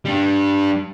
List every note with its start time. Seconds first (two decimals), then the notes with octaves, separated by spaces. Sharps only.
0.05 G3 D4